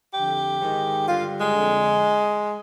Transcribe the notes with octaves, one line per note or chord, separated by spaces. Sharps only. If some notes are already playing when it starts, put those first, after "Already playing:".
F2 D3 G4
G#2
D#3
G2 D3 F4
G#3
F2 D3